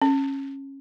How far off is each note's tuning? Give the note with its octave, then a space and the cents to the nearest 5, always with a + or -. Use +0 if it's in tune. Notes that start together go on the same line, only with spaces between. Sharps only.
C#4 -20